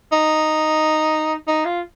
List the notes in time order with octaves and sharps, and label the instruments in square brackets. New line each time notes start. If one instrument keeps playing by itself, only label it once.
[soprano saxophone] D#4
D#4
F4